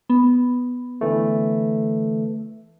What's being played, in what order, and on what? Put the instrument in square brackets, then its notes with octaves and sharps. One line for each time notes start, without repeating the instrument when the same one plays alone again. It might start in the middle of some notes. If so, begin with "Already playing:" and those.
[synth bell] B3
[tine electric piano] D3 E3 A3